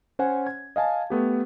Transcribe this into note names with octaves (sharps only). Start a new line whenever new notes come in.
C#4 C5 F#5 G#5
G#6
D#5 F5 G#5 A5
A3 B3 G4